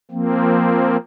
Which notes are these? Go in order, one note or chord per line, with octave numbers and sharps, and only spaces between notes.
F3 A#3 C4